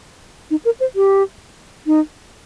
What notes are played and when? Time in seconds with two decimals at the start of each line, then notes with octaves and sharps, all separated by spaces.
0.51 D#4
0.65 A#4
0.80 C5
0.96 G4
1.87 D#4